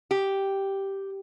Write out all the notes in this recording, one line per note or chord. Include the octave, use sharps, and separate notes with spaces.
G4